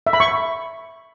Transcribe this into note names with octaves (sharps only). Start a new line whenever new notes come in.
E5
B5
C#6